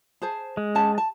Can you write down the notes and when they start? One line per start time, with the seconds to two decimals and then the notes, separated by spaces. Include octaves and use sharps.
0.22 G#4 C5 A5
0.57 G#3
0.75 C#4 G4 A5
0.98 A5